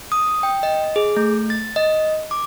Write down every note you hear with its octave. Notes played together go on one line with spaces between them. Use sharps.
D#6
G5
D#5
G#4
A3
A6
D#5
D6